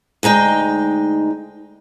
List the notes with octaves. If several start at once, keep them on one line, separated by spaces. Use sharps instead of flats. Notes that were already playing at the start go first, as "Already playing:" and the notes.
D2 G#3 D#4 G5